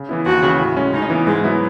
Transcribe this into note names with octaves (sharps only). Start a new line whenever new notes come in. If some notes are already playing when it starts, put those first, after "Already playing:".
Already playing: C#3
E3 B3 E4
D#2 F#4
C#3 E3
A2
G#3 C#4
C#3 D#4
E3 B3
G#2 G#3
F#3 B3 E4